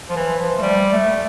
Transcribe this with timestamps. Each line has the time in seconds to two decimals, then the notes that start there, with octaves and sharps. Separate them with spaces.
0.09 F3
0.16 E3
0.39 F3
0.58 A3
0.62 G3
0.93 A3